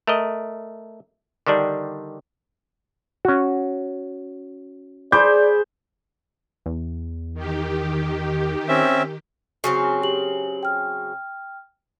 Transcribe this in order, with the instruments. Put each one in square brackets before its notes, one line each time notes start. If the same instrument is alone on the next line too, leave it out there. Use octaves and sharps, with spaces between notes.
[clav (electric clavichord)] A3 A#4 D#5
D3 D#3 G3 D4
C#4 F#4
[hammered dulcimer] G#4 C5 [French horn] D5 [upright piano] B5 D6 G6
[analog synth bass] E2
[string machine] D#3 G4
[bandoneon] C4 C#4 E5
[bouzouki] C#3 F#3 C4 [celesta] F#4 C#6
[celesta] G4 F#7
G5 F6